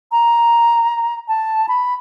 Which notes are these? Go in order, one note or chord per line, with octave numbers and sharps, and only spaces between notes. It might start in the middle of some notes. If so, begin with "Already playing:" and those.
A#5
A5
B5